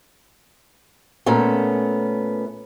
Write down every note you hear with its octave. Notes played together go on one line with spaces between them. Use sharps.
A#2 A3 B3 C#4